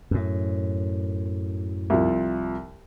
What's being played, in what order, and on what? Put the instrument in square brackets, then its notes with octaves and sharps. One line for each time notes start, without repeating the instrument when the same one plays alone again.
[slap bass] F#2 A2
[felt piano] C2 F3